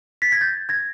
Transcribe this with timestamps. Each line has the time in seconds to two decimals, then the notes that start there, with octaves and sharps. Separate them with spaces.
0.22 A6 B6
0.32 G#6 A#6
0.41 G6 A6
0.69 G#6 A#6